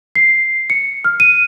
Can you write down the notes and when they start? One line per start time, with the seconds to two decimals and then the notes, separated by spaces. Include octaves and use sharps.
0.15 C7
0.70 C#7
1.05 F6
1.20 D#7